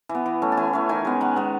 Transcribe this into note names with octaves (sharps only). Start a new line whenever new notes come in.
E3
B3
E3
A3 C#4
A5
E3 G#5
A3 C#4
D#3 G#5
G#3 B3
D#3 F#5
G#3 B3